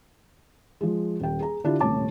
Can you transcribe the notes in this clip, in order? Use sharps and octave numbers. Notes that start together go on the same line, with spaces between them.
F3 G#3
D#1 G5
G#4 A#5
D3 D4 E4 F4 G4
D#1 A2 C3 C#5 A5 D6